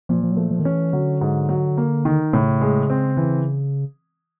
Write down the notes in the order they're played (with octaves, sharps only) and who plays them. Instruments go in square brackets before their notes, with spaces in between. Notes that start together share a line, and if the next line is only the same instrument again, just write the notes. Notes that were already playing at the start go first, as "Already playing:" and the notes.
[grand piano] A#2 [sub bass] F3
[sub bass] F3
F#3
[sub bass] F3 [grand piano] A3
[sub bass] F3
D#3
[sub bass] E3 [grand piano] C#4
[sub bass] D3 [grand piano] F#3
[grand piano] G#2
F#3
A#3
D#3
[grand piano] A2 [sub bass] C#3
[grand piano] G#3
C4
E3